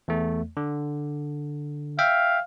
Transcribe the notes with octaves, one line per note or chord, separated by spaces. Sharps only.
E2 A3
D3
E5 F5 G5